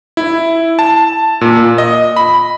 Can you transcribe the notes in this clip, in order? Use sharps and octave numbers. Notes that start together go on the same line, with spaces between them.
E4
A5
A#2
D#5
B5